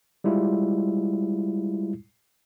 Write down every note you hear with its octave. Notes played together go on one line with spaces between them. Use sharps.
G3 G#3 E4 F4